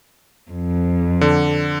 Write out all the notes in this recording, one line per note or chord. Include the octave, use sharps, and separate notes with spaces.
F2
D3